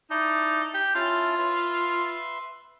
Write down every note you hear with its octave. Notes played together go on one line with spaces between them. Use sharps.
D#4 E4 D5 A5
G4
C#4 E4 F4 A5
B4 E5 C6